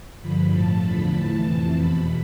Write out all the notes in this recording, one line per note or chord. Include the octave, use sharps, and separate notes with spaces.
G2 D3 F3 B5
A2 F3 A5
E2 D3 F3 B5
A2 E3 A5
F2 C3 E3
E2 B2 B5